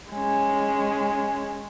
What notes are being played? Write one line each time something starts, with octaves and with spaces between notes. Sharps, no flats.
G#3 C#4